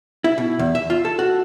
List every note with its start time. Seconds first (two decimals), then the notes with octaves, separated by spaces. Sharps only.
0.24 E4
0.38 B2
0.59 E2
0.75 E5
0.90 F4
1.05 A4
1.19 F#4